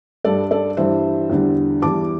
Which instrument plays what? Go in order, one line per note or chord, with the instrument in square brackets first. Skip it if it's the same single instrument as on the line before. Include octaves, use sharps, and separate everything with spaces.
[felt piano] G2 G3 A4 D5
A4 D5
G2 E3 G3 C5 E5
E2 D3 G3
E2 E3 G3 A5 D6